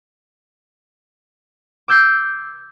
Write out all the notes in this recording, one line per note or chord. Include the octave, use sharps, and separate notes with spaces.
D6 E6 G6 G#6 C7